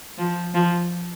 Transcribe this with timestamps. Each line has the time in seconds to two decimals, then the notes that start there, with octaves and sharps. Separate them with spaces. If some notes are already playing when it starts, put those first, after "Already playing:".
0.18 F3
0.54 F3